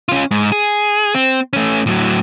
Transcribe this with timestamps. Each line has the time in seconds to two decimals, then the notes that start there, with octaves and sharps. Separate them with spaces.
0.09 C#4 F4
0.31 G#2
0.52 G#4
1.14 C4
1.53 A3 C#4
1.87 A2 F#3